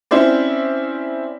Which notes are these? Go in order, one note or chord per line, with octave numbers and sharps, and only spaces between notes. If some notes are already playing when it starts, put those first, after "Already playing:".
C4 C#4 E4 C5 D5